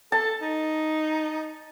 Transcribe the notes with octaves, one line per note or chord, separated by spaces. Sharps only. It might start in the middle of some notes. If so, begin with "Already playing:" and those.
A4 A5
D#4